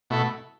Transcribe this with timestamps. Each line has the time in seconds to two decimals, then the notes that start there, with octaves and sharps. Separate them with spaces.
0.10 B2 A3 E4 A4